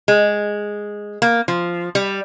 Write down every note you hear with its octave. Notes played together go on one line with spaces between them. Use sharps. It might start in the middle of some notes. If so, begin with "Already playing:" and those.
G#3
A#3
F3
G3